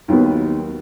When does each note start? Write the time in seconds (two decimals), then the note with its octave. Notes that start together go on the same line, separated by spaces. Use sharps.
0.08 D#2 D#3 F#3 B3